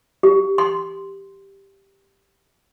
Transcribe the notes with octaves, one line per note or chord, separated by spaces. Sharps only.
G4
C6